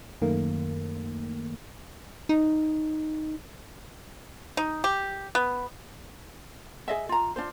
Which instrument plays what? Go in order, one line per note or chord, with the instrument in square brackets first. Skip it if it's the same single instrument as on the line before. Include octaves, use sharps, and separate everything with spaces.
[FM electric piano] F#2 D#3 A3 A#3
[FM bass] D#4
[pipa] D#4
G4
B3
[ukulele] G#4 D#5 E5
F4 A#5
D4 F4 C5